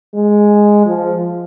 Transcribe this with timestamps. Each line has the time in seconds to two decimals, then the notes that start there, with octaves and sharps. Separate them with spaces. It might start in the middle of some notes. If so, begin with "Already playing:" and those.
0.14 G#3
0.86 F3